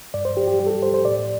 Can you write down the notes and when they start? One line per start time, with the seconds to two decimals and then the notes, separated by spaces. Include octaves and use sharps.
0.14 G2 D5
0.25 C5
0.37 G2 G4
0.48 G4
0.59 G3 G4
0.66 A4
0.71 G4
0.82 G2 C5
0.94 C5
1.05 A2 D5